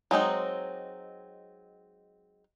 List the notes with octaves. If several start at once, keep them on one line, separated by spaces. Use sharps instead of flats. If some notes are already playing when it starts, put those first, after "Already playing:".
F#3 G#3 C4 D#4